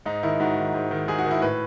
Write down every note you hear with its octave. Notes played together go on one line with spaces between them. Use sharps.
G#2 D#4
D#3 E4
G#2 F#4
D#3
G#2
D#3
G#2 G#4
F#4
D#3
E4
A2 B4